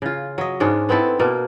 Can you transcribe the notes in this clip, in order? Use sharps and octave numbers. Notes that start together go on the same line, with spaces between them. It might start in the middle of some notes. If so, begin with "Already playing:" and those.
C#3 F4
F#3 D#5
G#2 G#3 C#4 D4
B3 C4 E4 A4
B2 A#3